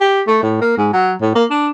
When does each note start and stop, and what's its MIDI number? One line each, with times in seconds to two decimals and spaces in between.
0.01 0.21 67
0.27 0.39 57
0.43 0.58 45
0.61 0.74 58
0.77 0.92 44
0.93 1.13 54
1.21 1.32 45
1.35 1.44 58
1.50 1.69 62